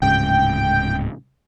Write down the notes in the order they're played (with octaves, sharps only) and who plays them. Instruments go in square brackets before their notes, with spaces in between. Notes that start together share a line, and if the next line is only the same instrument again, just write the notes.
[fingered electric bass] D1 G#2 C#3 [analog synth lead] G5